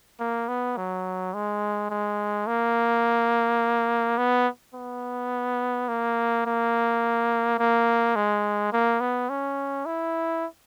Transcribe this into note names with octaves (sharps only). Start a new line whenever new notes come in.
A#3
B3
F#3
G#3
G#3
A#3
B3
B3
A#3
A#3
A#3
G#3
A#3
B3
C#4
E4